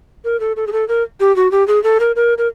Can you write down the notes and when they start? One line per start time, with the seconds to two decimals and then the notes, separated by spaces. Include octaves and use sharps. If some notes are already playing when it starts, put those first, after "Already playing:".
0.25 A#4
0.40 A4
0.56 A4
0.67 G#4
0.72 A4
0.88 A#4
1.20 G4
1.36 F#4
1.51 G4
1.67 G#4
1.83 A4
2.00 A#4
2.16 A#4
2.38 A#4